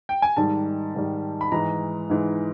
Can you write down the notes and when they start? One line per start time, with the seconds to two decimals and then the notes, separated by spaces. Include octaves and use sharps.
0.09 G5
0.22 G#5
0.37 G#2 D#3 G3 A5
0.94 G#2 D#3 G3
1.41 B5
1.52 G#2 E3 G#3 A#5
2.10 G#2 E3 G#3